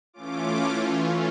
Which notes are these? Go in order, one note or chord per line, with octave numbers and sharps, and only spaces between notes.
E3 A3 C#4 F4 D6